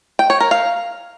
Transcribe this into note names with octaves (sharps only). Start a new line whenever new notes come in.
G5
C#5
A#4
F5